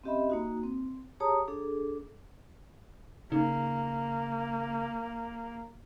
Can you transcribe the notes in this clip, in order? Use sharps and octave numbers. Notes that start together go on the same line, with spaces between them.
C4 C#4 G4 D#5 E5 B5
A#3 D#4 F#4
C4
G4 G#4 C#5 A5 A#5 D#6
D4 G#4 A4
C#3 A#3 D#4